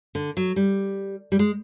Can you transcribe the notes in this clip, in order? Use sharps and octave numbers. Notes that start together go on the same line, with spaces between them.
D3
F#3
G3
G3
G#3